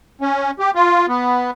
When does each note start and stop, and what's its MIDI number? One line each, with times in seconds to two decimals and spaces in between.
0.21 0.51 61
0.59 0.71 67
0.75 1.06 65
1.09 1.51 59